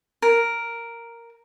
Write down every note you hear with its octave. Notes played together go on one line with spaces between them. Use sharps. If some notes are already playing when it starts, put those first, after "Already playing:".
A#4